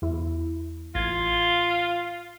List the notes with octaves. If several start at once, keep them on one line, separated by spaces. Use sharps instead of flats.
E2 E4
A1 F4 G#6